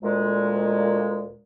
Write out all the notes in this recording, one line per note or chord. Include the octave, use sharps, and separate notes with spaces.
D2 A#2 G#3